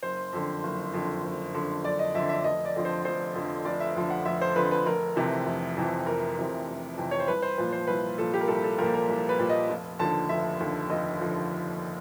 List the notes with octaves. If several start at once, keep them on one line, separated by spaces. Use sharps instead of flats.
F#1 C5
F2 D3
F#1
F2 D3
F#1
F2 D3
F#1 D5
D#5
F2 D3 E5
E5
F1 D#5
D5
F2 D3 F3
C5
F1 C5
F2 D3 F3
F1 D5
E5
F2 D3 F3
F#5
F1 E5
C5
F2 D3 F3 B4
B4
F1 A#4
F2 C3 E3
F1
F2 C3 E3
F1 A#4
F2 C3 E3
F1
F2 C3 E3
C#5
C5
C2 B4
C5
A#2 F3 B4
C5
C2 B4
A#2 F3 A4
G4
A#4
C2 A4
A4
A#2 F3 A#4
A#4
C2
B4
A#2 F3
D#5
F1
D#2 D3 F3 A5
F1 E5
D#2 D3 F3
F1 D#5
D3 F3